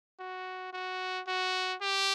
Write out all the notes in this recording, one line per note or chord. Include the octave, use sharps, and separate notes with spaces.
F#4
F#4
F#4
G4